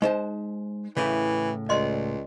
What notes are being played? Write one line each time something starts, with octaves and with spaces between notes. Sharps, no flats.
G#3 D#4 C5 A5
A2 C#3 E3
C#2 D5 D#5 C6